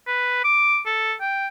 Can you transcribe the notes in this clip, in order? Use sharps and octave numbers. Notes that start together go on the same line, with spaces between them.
B4
D6
A4
G5